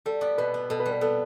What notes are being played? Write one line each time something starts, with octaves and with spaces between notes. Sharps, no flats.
G3 A4
B3 D5
B2 B4
B3
B2 A4
B4
G3
B4
B3 A4